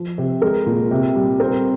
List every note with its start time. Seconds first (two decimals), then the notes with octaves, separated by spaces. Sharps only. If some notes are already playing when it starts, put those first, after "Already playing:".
Already playing: F3
0.18 C3
0.42 G#3 A#4
0.66 A#2
0.91 C3
1.15 G3
1.40 C4 A#4